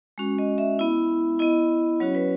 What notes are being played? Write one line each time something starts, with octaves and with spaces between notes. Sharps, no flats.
G#3 C#4 F#4
D#5
E5
B3 E4
B3 E4 D#5
F#3 C#4 F#4 C#5
B4